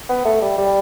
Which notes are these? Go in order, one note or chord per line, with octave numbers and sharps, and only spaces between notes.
B3
A3
G3
G3